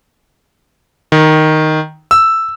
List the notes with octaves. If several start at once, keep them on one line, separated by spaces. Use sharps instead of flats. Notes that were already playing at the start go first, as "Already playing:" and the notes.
D#3
E6